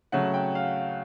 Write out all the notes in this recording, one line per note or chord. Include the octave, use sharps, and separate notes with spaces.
C#3 F#3 A3 F#5
G5
F5